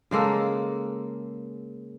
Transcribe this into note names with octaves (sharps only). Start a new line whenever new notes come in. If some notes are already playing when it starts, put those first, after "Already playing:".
C#3 G#3 A#3 A4